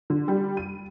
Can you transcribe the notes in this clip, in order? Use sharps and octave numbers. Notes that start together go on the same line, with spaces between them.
D3
G3
D#7